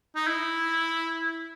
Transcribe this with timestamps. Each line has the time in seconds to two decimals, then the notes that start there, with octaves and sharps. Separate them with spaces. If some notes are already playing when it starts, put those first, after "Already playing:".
0.16 D#4
0.27 E4